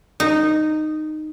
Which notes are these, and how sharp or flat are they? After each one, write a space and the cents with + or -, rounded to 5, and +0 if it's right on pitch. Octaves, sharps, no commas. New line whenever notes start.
D#4 -10